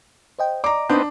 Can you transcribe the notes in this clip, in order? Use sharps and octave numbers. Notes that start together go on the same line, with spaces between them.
C5 D#5 G5
D5 D#5 A#5 D6
B3 C4 D4 D#4 G6